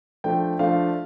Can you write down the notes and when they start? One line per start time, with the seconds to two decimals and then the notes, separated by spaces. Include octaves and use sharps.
0.24 F3 A3 D4 G5
0.59 F3 A3 D4 F5